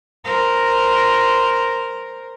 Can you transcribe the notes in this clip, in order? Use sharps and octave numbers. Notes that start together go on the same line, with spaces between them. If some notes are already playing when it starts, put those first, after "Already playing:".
A#4 C5